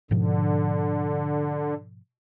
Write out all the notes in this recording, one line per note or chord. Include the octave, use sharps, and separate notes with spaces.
G#2 B2 D3 F3